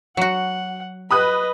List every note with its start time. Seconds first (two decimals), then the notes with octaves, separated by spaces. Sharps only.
0.17 F#3 F#4 F#5
1.11 B4 D#5 B5 D#6 F#6